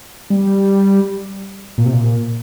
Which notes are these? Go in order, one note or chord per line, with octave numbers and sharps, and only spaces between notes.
G3
A#2
C3
A#2